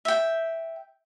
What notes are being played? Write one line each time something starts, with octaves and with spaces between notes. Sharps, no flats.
E5 G5